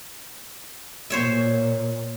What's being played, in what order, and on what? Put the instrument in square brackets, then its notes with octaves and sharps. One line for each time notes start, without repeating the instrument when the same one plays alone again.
[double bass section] A#2 [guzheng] C5 C#5 E5